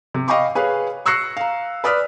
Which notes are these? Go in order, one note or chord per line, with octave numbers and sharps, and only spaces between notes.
C3
D#5 F5 G5 B5 C#6 D6
G#4 B4 C#5 F5
C#6 E6 F#6 A#6 C7 C#7
F5 A#5
B4 D5 D#6 F6 B6